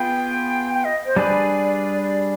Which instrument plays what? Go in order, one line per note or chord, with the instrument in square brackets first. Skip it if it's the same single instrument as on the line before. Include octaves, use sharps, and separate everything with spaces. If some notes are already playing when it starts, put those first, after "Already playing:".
Already playing: [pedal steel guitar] B3 F4 G#4 B4 [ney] G5
[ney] G5
D#5
C5
[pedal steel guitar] G3 D4 G#4 B4 [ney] D5
[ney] D5